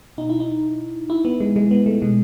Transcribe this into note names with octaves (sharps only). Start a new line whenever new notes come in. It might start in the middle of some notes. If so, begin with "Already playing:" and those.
B2 D#4
E4
D#4
E4
B3
G#3
G#3
B3
A3
B2 G#3